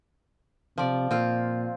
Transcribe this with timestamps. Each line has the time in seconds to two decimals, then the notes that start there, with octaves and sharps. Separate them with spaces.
0.78 C3 F3 D5
1.11 A#2 C4 F4